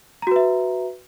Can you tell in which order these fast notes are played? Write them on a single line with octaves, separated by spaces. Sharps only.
A#5 F#4 B4 E5